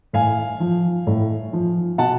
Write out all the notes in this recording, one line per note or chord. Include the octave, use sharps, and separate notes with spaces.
A2 F5 G#5
F3
A2
F3
B2 F#5 A5